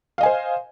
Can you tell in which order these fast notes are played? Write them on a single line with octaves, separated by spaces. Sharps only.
F5 D#5 G#5 C5